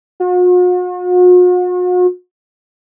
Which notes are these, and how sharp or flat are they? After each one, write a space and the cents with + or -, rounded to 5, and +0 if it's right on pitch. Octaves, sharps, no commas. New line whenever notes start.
F#4 -45